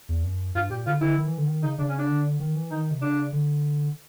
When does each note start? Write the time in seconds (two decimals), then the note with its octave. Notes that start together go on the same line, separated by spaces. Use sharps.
0.09 E2
0.23 F#2
0.55 G2 F4
0.70 A#2 G4
0.86 D3 F4
1.01 D3 E4
1.17 D#3
1.26 E3
1.38 D3
1.47 D#3
1.62 C#3 D#4
1.78 C#3 D4
1.89 C#4
1.98 D4
2.09 D3
2.40 D#3
2.55 E3
2.70 D#3 D#4
2.91 C3
3.01 C#3 D4
3.32 D3